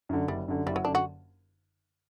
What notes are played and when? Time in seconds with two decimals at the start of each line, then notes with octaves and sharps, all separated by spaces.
0.09 F#2 D3
0.28 F#1 G3
0.48 F#2 D3
0.66 F#1 G3
0.76 F#3
0.85 F#2 D3 D4
0.95 F#4